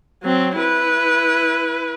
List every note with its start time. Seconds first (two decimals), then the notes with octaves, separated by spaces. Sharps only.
0.23 F#3 C4
0.59 E4 B4